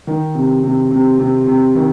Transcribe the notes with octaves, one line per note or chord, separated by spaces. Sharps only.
D#3
C3
C3
C3
C3
C3
D#3